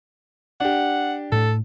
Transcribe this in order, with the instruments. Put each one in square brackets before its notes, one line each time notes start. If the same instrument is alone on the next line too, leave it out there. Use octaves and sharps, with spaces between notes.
[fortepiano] D4 G4 [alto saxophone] F#5
[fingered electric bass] A2 A3 [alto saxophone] A4